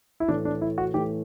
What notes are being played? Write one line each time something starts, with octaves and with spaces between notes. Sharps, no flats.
E4
A2 E3 A3 D4
D4
E4
F#4
A2 E3 A3 G4